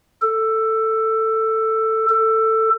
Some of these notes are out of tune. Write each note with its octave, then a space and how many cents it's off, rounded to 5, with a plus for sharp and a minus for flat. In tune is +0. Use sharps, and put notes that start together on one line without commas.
A4 +10
A4 +15